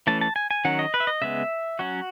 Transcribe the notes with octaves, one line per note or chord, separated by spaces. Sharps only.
E3 A3 C#4 A5
A5
G#5
G#5
D#3 F#3 C#4 F#5
D#5
B4
E5
D#5
C#3 G#3 B3 E5
F#3 C#4 F#4